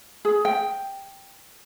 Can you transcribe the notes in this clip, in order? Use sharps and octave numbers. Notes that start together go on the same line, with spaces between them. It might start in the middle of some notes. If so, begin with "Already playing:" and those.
G#4
G5